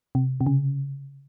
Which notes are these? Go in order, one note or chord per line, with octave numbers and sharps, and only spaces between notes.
C3
C3
C#3